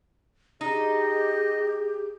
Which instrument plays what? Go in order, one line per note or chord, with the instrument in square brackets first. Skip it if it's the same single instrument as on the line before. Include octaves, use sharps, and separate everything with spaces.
[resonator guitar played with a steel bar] D#4 [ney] G4 [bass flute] G#4 [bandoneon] D#5